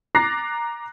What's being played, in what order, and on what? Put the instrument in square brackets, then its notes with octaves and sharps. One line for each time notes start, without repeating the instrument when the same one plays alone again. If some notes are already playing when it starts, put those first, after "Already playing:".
[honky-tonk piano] A#5 D6 F#6 A6 A#6 C7